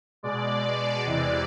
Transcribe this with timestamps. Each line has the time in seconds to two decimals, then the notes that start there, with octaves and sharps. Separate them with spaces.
0.23 B2 G#3 D5
1.05 E2 C3 E3 G#3 D5